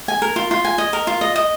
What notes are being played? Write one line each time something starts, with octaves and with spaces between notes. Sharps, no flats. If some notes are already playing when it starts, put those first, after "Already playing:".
G#5
A#4
F4
F4
G#5
D#5
A#4
F4
D#5
D#5